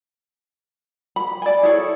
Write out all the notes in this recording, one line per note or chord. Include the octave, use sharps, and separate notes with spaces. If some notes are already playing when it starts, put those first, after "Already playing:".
B5
D5 G#5
E4 G#4 A4 C#5